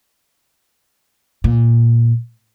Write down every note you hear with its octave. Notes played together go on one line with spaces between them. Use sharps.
A#2